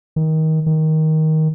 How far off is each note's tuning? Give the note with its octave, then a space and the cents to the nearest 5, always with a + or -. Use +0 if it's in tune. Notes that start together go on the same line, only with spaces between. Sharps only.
D#3 +25
D#3 +15